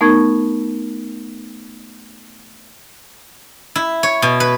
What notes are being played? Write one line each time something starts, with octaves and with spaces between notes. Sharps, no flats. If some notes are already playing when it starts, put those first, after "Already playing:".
A3 B3 D#4 A#4 C#6 G#6
E4
C#5
B2
B4